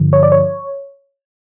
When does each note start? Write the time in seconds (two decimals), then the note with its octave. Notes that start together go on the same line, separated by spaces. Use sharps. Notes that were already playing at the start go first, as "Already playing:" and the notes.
Already playing: G2 D3 F3
0.13 C#5
0.23 D5
0.32 C#5